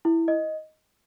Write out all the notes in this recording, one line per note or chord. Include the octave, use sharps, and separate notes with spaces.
E4
D#5